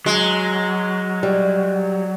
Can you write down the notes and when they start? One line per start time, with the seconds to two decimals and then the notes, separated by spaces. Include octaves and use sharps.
0.06 F#3 G#3
1.23 G3